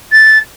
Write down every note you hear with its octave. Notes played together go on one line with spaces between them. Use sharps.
A6